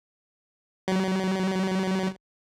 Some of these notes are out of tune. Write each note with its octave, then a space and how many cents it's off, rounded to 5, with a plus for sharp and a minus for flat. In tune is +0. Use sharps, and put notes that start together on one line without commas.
F#3 +35